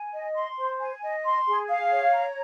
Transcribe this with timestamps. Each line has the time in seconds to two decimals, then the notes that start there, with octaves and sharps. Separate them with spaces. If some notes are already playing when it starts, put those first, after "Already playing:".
Already playing: G#5
0.13 D#5
0.36 C6
0.59 C5
0.80 G#5
1.02 D#5
1.24 C6
1.47 G#4
1.69 F5
1.91 C#5
2.13 A#5